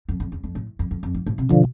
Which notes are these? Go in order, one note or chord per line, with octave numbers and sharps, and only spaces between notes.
F2
F2
E2
F2
A2
F2
F2
F2
G#2
A2
C3
B2 D3 F3